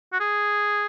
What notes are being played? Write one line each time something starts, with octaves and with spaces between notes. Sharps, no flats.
F#4
G#4